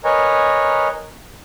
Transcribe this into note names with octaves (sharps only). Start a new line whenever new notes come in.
A#4 B4 C#5 D#5 G#5 A#5